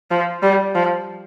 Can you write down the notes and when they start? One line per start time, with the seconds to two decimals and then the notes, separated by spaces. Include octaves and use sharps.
0.11 F3
0.43 G3
0.75 F3